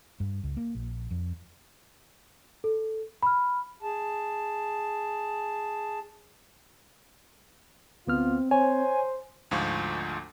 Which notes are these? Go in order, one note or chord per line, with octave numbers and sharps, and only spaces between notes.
G2
C#2
A#3
A#1
F2
A4
B5 F6
G#4 A5
D2 B3 C4 F4 F6
C5 C#5 G#5
D2 G#2 F3 F4 C#6